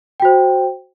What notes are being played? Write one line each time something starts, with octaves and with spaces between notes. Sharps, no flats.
F#4 C5 G5